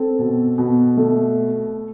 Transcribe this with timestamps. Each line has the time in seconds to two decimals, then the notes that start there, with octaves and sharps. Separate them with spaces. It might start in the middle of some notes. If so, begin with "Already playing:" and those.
Already playing: C4 A4
0.19 B2
0.58 B2
0.97 A3